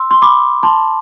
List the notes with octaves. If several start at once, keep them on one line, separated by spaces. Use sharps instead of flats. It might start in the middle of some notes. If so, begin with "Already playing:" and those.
Already playing: C6 E6
C6
B5 D6
A5 C6